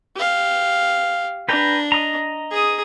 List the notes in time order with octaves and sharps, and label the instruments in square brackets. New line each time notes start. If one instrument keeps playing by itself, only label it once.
[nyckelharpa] G4 F5
[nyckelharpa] D4 [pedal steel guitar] B4 G5 A#5
[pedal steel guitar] D#5 A#5
[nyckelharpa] G#4 D#6